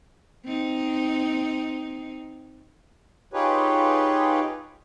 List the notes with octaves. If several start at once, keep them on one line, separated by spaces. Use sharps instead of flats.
C4 D#4
D#4 F4 G4 G#4 B4 C#5